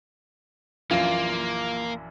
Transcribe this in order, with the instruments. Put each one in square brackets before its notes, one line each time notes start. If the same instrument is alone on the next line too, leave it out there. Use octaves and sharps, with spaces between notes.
[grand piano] A#1 F#2 E3 [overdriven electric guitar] A#3 [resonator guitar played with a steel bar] F4